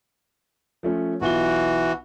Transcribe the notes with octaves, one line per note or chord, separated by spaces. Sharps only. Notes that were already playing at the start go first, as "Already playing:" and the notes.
F3 A3 C#4
B1 E3 F4 F#4 G7